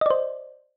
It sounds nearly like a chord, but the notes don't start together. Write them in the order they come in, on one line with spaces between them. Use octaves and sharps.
D#5 D5 C5